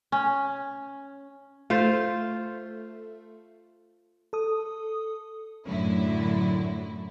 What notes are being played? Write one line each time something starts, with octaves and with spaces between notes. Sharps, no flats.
C#4
A3 F4 C5
A4 D#6
F#2 A2 D3 F#3 E4